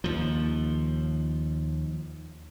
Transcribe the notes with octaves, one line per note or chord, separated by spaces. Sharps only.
D#2 F3